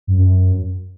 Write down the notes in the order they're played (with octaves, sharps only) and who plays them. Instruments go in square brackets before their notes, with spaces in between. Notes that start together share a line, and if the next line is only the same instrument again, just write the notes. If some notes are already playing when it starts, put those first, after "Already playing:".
[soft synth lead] F#2